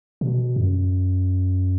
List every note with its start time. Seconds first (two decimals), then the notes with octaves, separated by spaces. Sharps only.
0.21 B2
0.56 F#2